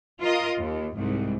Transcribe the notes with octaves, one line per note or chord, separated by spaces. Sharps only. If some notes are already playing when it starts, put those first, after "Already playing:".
F4 A#4 D#5
D#2
C2 G#2